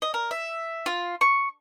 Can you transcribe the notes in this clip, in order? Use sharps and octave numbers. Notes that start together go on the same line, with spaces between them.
D#5
A#4
E5
F4
C#6